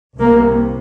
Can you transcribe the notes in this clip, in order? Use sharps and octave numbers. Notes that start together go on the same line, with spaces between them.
C2 C3 A#3